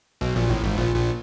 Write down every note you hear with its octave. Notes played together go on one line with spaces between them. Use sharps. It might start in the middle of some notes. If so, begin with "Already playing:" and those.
B1 B2
A#1 A#2
A1 A2
G#1 G#2
A#1 A#2
A#1 A#2